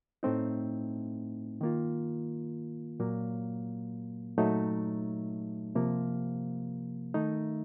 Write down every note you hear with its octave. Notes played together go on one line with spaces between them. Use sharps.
A2 A3 C4 D#4
D#3 A#3 F4
A#2 F#3 A#3
A#2 F#3 A3 D#4
C3 F3 A#3
D#3 A3 D#4